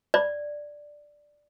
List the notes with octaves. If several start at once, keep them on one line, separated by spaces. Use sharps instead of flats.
D5